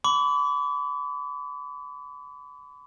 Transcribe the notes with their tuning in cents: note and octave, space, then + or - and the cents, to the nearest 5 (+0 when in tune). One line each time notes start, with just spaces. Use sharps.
B5 +30 D6 -40